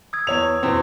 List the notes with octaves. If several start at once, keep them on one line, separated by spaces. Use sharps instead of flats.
D#6 E6 G#6
E2 C#5 F7
E2 B2 C4